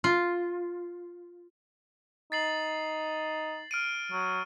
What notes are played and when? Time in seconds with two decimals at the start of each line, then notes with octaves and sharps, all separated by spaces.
0.04 F4
2.32 D#4 A6 C7 F#7
3.71 F6 D7 D#7
4.12 F#3